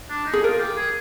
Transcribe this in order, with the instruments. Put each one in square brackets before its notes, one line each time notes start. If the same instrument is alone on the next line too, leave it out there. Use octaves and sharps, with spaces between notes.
[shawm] D4
D#4
[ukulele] G#4
[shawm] F4 [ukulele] A#4
[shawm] G4
G#4